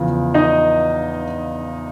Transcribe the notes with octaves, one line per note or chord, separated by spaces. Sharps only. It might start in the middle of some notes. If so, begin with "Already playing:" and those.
Already playing: E2 C#3 F3
D#4 D#5